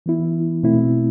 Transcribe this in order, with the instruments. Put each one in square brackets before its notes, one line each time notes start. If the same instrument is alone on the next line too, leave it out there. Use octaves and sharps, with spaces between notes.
[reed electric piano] E3 B3 E4
B2 A3 C4 E4